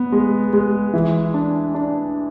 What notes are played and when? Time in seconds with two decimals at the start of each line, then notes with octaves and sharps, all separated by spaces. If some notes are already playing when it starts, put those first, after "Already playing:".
Already playing: B3
0.12 G#3
0.53 G#3
0.94 E3
1.34 D4
1.74 D4